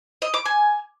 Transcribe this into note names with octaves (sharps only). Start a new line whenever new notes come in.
D#5
D6
G#5